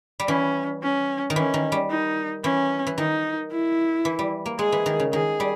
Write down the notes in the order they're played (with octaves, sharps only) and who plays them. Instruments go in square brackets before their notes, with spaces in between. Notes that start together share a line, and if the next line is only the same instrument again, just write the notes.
[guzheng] G3
[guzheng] E3 [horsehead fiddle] C#4
[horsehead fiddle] C#4
[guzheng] D#3
[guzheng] E3 [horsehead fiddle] C#4
[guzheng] D#3
G3
[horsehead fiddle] D#4
[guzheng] E3 [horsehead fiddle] C#4
[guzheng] E3
[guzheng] D#3 [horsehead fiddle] D#4
[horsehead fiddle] E4
[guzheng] E3
G3
A#3
[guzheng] G#3 [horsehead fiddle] G#4
[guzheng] E3
D#3
C#3
[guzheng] D#3 [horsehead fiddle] G#4
[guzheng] G3